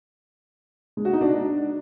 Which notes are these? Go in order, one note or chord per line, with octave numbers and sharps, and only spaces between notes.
G#3
F#4
D#4
D4